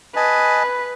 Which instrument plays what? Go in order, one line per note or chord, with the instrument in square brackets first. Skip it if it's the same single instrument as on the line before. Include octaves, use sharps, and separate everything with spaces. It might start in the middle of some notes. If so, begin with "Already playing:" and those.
[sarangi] B4 [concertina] D#5 G#5 A5